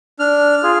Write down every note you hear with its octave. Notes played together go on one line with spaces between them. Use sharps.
D4 F6
F4 G#4